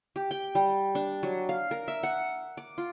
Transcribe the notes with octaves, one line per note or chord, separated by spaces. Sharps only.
G4
G5
G3
D4
F#3
F5
A#4
E5
F#5
D6
F4